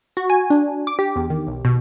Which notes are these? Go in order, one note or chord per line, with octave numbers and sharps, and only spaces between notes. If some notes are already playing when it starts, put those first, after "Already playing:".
F#4
G#5
D4
D6
G4
E2
D#3
B1
B2